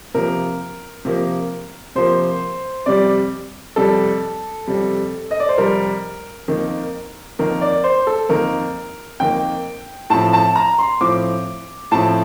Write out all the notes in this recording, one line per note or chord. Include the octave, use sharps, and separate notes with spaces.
C3 F3 A#3 A#4
C3 F3 A#3
C3 F3 A#3 C5
F2 C3 G3 D5
F2 C3 G3 A4
F2 C3 G3
D#5
D5
C5
F2 C3 G3 A#4
F2 D#3 A#3
F2 D#3 A#3 A#4
D5
C5
A4
F2 D#3 A#3 A#4
F2 D#3 A#3 G5
A2 F3 C4 A5
A5
A#5
C6
A2 F3 C4 D6
A2 F3 C4 A5